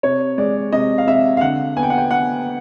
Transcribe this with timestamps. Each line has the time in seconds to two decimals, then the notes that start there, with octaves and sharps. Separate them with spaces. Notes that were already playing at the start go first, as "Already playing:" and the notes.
0.03 C3 C#5
0.38 G#3 D5
0.72 C3 D#5
0.98 F5
1.07 C3 E5
1.37 F5
1.41 D3 F#5
1.77 B3 G#5
1.83 G5
1.90 F#5
1.98 G5
2.11 B3 F#5